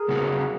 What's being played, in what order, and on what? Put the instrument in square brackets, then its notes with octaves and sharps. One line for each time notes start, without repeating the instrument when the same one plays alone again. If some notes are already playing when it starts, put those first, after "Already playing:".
Already playing: [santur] G#4 A#4
[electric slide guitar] C#3 F#3 B3 D#4 F#4